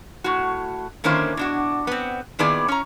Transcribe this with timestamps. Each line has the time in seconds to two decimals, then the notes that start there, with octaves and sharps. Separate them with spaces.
0.24 A2 F#4
1.04 D3 D#3 A#3 C#4 E4 C5
1.37 B2 D4 F#4
1.87 B3 C4
2.39 A#2 D#3 B3 E4 G#4 D5
2.68 C#4 A#5